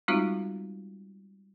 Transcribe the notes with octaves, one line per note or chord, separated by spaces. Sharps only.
G3 G#3 C4 D#4 F4 F#4